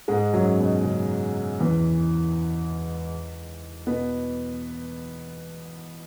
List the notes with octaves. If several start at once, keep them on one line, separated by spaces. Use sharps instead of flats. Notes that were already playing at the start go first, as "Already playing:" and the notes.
G#2 G#3
F#2 F#3
B2
C#3
E2 E3
B2 B3